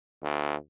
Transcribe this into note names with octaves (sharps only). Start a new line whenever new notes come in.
D2